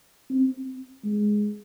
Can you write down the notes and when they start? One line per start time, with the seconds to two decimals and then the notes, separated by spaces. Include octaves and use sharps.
0.30 C4
1.04 G#3